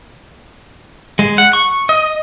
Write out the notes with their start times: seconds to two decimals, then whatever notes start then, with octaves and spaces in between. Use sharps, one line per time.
1.19 G#3
1.38 F#5
1.53 C#6
1.89 D#5